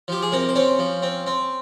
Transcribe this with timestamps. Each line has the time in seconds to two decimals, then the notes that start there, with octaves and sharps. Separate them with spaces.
0.08 F3 G4
0.22 G#4
0.32 C3 A#3 A#4
0.49 C5
0.55 C4 C#4 C#5
0.79 F3
1.02 C4
1.26 C4